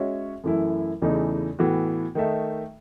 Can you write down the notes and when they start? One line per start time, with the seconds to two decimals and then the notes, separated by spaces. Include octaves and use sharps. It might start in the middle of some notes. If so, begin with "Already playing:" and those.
Already playing: G#3 C#4 F#4 C#5 E5
0.44 F#2 E3 A3 E4
1.02 E2 C#3 E3 A3 D#4
1.59 A2 E3 B3 F#4
2.15 D#3 A3 D#4 A4 E5